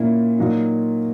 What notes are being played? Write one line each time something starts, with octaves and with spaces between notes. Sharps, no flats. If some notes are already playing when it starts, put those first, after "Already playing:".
Already playing: A#2 A#3 C#4 E4
A#2 F#3 A#3 D#4